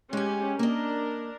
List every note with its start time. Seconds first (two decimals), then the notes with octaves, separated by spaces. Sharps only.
0.13 G#3 C#4 G4 G#5
0.59 A#3 D4 A#4 D#5